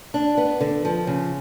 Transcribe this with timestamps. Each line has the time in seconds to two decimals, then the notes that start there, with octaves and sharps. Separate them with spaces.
0.14 D4
0.37 B3
0.61 D3
0.85 F3
1.07 C#3